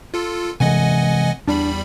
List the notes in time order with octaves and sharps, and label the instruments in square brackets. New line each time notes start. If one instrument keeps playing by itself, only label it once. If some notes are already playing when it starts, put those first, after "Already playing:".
[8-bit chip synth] F4 A4
[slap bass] C3 E3 G#3 [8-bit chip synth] D#5 F#5 G#5
[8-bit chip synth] E2 G3 B5 [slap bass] D4